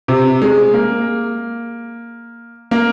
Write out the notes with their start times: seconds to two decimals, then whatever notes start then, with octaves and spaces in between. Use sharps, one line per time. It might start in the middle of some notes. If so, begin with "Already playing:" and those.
0.08 C3
0.42 G#3
0.74 A#3
2.71 A#3